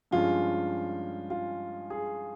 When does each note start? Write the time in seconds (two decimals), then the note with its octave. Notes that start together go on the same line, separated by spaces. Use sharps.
0.11 G2 F3 G#3 C#4 F4
1.30 F4
1.90 G#4